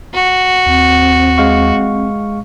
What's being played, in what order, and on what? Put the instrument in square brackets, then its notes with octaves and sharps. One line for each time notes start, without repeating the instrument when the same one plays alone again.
[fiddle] F#4
[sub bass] D#2 [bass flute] C4
[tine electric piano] G#3 F5 C#6